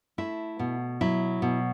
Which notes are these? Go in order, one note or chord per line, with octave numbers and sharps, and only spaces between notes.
A3 E4
B2
F#3 E4
B2